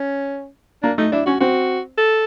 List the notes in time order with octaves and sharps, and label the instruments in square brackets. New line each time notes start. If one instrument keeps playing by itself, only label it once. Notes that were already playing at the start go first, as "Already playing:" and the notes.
Already playing: [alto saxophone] C#4
[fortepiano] A#3 [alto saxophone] D4
[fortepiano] A3 [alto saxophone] D#4
[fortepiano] D4 [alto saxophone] E4
[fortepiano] C#4 [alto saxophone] F#4
[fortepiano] C4 [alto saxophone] F#4
[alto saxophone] A4